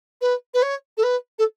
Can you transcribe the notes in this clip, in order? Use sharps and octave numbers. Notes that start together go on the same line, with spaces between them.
B4
B4
C#5
A4
B4
A4